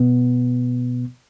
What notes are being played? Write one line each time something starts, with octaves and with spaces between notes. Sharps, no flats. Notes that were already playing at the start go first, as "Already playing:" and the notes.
Already playing: B2 B3